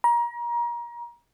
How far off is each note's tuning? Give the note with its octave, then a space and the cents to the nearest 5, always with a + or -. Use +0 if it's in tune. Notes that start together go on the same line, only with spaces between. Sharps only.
A#5 +30